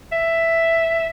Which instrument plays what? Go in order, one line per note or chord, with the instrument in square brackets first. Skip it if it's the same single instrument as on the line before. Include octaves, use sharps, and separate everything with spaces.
[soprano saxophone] E5